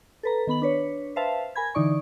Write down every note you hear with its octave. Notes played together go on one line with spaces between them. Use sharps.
A4 B4 A#5
D#3 B3 B5 F#7
D4 B4 C#5
B4 C5 E5 F5 A5
A#4 G#5 B5 G#6
D3 E3 D#4 D5 C#6